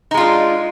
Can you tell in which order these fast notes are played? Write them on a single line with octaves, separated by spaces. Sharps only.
D#4 G#3 F4 D4